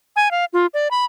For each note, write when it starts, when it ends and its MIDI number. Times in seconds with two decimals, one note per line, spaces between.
0.16 0.31 80
0.31 0.45 77
0.53 0.66 65
0.74 0.88 74
0.91 1.05 83